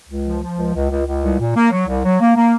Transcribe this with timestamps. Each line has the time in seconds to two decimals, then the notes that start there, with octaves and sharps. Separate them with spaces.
0.09 C#2
0.26 F3
0.41 F3
0.57 C#2
0.75 C#2
0.90 C#2
1.06 C#2
1.22 C2
1.39 A#2
1.56 A#3
1.71 F#3
1.87 C2
2.04 F#3
2.20 A#3
2.35 A#3